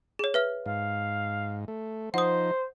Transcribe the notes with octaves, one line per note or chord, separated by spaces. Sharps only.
G#4 C#5
B4 E5 F6
G#2 F5
A3
F3 D#4 C5 F#5 D#6